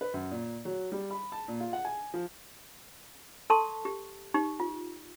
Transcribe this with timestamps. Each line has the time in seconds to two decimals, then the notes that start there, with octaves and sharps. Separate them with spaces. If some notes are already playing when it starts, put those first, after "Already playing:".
0.01 B4
0.14 F#2
0.31 A#2
0.65 F#3
0.92 G3
1.11 B5
1.32 A5
1.48 A#2
1.60 F4
1.73 F#5
1.85 G#5
2.14 F3
3.50 A4 A5 C6 C#6
3.85 G4
4.34 D#4 G4 C#6
4.60 F4